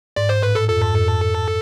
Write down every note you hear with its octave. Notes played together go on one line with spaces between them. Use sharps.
G#2 D5
C5
A2 B4
A4
F2 A4
G#2
F2
G#2